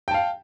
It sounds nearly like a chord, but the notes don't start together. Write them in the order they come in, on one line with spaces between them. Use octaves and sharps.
G5 A5 F5